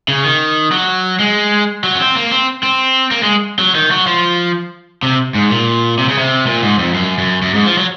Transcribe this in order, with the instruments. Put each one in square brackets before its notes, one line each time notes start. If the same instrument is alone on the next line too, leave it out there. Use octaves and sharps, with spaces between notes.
[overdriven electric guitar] C#3
D#3
F#3
G#3
F#3
C#4
C4
A#3
C4
C4
A#3
G#3
F#3
D#3
F#3
F3
C3
G#2
A#2
C3
C#3
C3
A#2
G#2
F2
F#2
F#2
F#2
G#2
F3
F#3